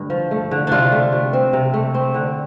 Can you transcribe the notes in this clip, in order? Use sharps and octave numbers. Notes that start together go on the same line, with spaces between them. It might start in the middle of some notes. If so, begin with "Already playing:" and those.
Already playing: G2 D3 A3
F3
A3
D3
C3 D4 F4
A3
C3
C4
C3
A3
C4
D3